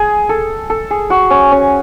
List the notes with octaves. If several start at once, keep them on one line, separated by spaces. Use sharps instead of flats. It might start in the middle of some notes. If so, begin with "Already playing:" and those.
Already playing: G#4
A4
A4
G#4
F#4
C#4
C#4